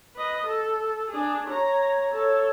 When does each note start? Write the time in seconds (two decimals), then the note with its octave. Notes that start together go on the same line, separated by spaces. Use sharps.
0.16 B4 D#5
0.46 A4
1.10 D4 G#4
1.47 C#5 A#5
2.11 A4 C#5